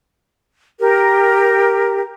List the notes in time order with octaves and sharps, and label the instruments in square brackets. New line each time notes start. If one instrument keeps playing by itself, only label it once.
[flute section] G4 A#4